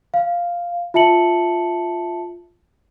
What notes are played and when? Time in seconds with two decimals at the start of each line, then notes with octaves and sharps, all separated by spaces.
0.14 F5
0.94 F4 E5 A5 C#7 F#7